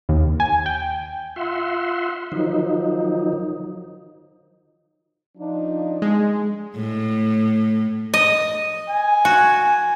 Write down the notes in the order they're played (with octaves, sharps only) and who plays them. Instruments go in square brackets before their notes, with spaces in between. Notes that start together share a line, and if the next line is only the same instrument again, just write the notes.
[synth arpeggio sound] D#2
G#5
G5
[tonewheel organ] F4 E5 F#5 C6
D#3 F3 F#3 D#4
[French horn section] F3 D4 D#4
[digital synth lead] G#3
[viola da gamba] A2
[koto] D#5
[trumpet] G#5
[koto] F#4